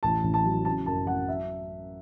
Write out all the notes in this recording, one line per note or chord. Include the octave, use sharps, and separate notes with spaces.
A1 A5
A1
A5
F#3
C#3 A5
F#2 A5
F#3 F#5
E5